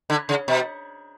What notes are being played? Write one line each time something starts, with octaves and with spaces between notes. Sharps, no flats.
D3
C#3
B2